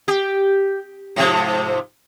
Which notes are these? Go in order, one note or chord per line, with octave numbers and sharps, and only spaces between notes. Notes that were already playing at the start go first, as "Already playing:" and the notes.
G4
G#2 C3 F3